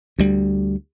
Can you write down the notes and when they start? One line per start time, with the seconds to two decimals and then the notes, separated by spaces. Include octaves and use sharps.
0.19 D2 G3